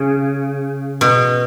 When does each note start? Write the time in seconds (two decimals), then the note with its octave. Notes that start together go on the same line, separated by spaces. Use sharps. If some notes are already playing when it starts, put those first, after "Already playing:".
Already playing: C#3
1.01 B2